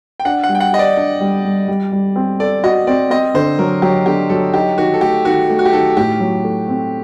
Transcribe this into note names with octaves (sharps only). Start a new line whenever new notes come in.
G5
D4 F#5
F#5
G3
G5
F#5
G4 D#5
D5
D4
G3
G3
G3
G3
C4
A4 D5
F#4 D#5
C4 D5
C4 D#5
D3 C5
F#3 A#4
F#3 G4
D3 G4
F#3 A4
D#4 G4
D#3 F#4
A4
A3 G4
D#3 F#4
A3
F#4
G4
D#3 A4
A2 G4
F#3
A3
C4